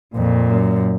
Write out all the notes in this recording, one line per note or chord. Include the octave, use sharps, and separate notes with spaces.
F2 A#2
F#2